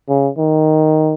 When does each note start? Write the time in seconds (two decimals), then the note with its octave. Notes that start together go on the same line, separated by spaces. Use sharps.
0.09 C#3
0.38 D#3